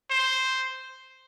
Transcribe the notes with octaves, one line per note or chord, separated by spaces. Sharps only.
C5